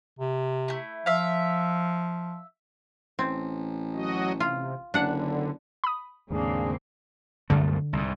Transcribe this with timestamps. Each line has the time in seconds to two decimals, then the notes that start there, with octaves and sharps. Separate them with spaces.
0.19 C3
0.68 A3 E4
1.06 F3 E5 F5
3.19 A1 C4
3.94 F#3 F#4 D#5
4.40 C3 F4
4.94 F#1 D3 D4 F#5
5.84 B5 D#6
6.30 D#2 G#2 C#3 A#3 C4 D4 G#4
7.50 C2 F#2 D3 A3
7.93 C2 G#2